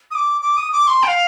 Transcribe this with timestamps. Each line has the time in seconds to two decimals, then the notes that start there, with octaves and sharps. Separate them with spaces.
0.11 D#6
0.15 D6
0.42 D6
0.57 D#6
0.72 D6
0.87 C6
1.03 G5
1.08 F5